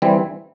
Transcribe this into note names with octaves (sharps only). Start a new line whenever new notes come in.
E3 G3 C4